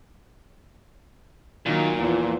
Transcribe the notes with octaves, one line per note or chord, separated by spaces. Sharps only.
A#2 D#3 F#3 A#3
E2 F3